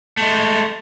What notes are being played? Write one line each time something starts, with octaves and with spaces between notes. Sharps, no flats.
G#3 A3